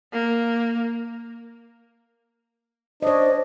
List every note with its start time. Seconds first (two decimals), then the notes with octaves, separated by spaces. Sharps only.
0.13 A#3
3.02 D4 C5 C#5 D#5